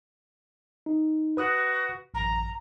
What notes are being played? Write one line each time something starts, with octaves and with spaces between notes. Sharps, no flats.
D#4
F#4 B4 D#6 F#6
A1 F#2 A#5